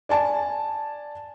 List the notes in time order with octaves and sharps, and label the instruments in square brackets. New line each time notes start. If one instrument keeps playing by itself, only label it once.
[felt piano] D5 G#5 A5